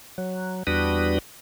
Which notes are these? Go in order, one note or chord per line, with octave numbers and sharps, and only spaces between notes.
F#3
E2 G3 D4 F#4 B4 D#6